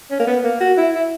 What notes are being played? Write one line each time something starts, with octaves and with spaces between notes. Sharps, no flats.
C#4
A#3
B3
A#3
F#4
E4
E4